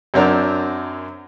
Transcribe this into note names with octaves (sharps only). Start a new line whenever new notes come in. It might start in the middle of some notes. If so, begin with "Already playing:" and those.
F#2 F#3 C4 D4 A#4